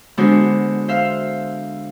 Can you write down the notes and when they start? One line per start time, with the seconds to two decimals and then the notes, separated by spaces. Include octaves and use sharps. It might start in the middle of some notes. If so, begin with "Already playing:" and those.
0.17 D3 G#3 B3 D4 F#4 C5
0.88 C5 E5 F5